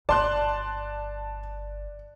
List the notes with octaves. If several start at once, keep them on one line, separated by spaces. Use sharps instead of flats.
G1 D5 A5 C6 F#6